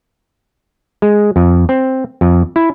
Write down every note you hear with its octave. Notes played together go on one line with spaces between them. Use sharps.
G#3
F2
C4
F2
E4